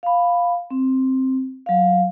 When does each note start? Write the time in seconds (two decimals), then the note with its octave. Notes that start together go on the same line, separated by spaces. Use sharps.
0.03 F5 B5
0.70 C4
1.66 F#3 F5